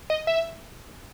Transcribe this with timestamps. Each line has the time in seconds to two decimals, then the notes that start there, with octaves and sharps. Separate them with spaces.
0.10 D#5
0.27 E5